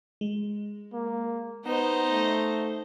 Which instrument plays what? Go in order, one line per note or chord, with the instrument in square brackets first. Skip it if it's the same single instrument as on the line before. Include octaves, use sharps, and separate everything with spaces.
[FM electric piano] G#3
[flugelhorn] A#3
[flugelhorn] B3 [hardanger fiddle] D#4 C5 [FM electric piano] F#5 A#5
[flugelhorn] A3